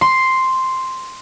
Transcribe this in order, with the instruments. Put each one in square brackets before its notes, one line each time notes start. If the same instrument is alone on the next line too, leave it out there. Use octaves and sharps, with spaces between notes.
[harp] C6